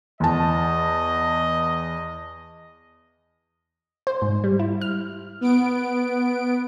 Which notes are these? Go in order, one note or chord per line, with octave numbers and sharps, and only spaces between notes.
E2 D#5 A5
C5
G#2
G3
E4
F6
B3 D7